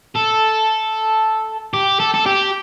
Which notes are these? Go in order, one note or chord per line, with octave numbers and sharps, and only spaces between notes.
A4
G4
A4
A4
G4